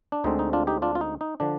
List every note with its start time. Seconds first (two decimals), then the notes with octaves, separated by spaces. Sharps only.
0.12 D4
0.24 D2 D3 G#3 C4 D#4
0.39 D#4
0.53 D4 F4
0.67 D#4 G4
0.82 D4 F4
0.95 F4
1.01 D#4
1.21 D#4
1.40 D3 F3 D4